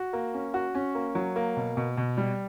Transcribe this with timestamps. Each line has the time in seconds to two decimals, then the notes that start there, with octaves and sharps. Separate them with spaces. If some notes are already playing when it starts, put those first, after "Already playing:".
Already playing: F#4
0.13 A#3
0.34 C#4
0.54 F#4
0.75 C#4
0.95 A#3
1.15 F#3
1.36 A#3
1.57 B2
1.77 B2
1.97 B2
2.17 G3